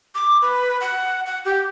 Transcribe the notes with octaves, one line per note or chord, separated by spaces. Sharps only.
D6
B4
F#5
F#5
G4